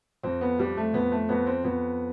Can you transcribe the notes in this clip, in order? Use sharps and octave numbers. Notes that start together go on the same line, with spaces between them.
F2 C4
B3
F2 G3
A3
F2 B3
A3
F2 B3
C4
F2 B3